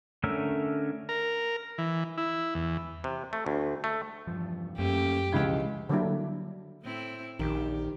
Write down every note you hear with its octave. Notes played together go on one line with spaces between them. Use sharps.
D3 A3 C#4 A#4 E5
A#4
E3
E4
E2
C3
A3
D2
A3
E2 G2 F3
F#2 A3 A#3 C#4 G4
C#2 B2 E3 F3 G#3 G#6
D3 F#3 G3 A#3 D4 E4
A2 C4 E4
A#1 D#3 G4